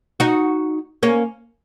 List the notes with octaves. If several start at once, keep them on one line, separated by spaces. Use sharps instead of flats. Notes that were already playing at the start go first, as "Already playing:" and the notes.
D#4 F#4
A#3 C#4